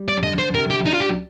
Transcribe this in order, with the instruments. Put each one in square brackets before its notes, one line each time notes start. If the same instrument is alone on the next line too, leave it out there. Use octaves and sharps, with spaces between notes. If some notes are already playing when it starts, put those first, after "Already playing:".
Already playing: [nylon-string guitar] G3
[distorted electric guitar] D5
[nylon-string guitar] D3 [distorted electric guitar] D#5
[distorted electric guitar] C5
[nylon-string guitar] C3 [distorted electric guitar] A#4
[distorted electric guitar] G4
[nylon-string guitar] D4 [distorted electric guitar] D#4
[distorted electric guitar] F4
G4